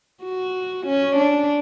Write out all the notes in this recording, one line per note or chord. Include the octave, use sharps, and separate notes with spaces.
F#4
C#4
D4